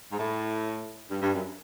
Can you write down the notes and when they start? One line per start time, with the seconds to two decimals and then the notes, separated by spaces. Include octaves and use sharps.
0.12 G#2
0.19 A2
1.10 G2
1.21 G2
1.34 F#2